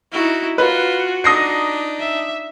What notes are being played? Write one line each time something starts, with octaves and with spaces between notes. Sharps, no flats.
D#4 E4 F#4
F4 F#4 B4
D4 D#4 D#6 A#6 C7
E5